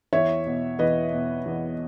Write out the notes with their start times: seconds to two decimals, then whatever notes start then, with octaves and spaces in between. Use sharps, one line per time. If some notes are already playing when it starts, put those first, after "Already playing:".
0.13 E2 C#5 E5
0.46 B2
0.79 E2 B4 D#5
1.12 B2
1.46 E2